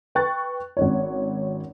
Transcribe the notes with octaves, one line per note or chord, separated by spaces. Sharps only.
B4 G5 C#6 F#6 A6
G#1 C#4 C#5